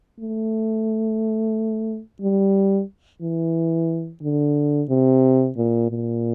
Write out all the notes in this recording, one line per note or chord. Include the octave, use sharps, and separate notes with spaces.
A3
G3
E3
D3
C3
A#2
A#2